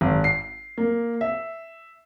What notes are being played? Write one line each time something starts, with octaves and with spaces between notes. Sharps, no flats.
G#1
C7
A#3
E5